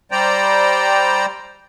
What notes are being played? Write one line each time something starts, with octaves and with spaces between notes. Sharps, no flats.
G3 C5 D5 G5 A#5